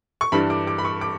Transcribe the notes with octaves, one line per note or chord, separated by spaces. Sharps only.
C#6
G2 E3 G3 D4 B5
D6
D6
B5
C#6
D6